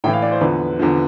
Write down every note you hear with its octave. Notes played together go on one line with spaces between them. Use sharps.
A2 E3 G5
F5
D5
C5
E2 D3 F3 B4
E2 D3 F3